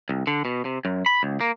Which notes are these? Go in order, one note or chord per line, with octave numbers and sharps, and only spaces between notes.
C2
D3
B2
C3
F#2
B5
C#2
A#3